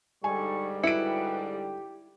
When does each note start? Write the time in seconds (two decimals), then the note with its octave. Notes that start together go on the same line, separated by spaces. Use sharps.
0.24 G#2 D3 G3 D#4 A4 G#5 C#6
0.83 E4 F#4 B4 C#7 D7
1.53 G4